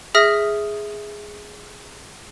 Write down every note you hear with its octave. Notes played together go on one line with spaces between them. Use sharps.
G#4 E5 D#6 F6 A#6